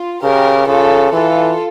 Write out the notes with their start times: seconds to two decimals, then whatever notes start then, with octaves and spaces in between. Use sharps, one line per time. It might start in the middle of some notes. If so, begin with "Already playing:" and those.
Already playing: F4
0.23 C#3 G4 A#4
0.68 C#3 F4 A4
1.13 E3 F4 A4